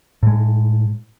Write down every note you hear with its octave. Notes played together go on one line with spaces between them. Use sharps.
A2 G#3